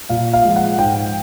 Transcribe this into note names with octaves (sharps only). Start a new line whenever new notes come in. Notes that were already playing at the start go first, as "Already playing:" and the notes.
A#2 F5
F5
F3 G#3
F#5
G#2 G5